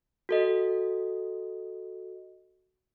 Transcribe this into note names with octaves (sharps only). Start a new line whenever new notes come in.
F#4 A4 D#5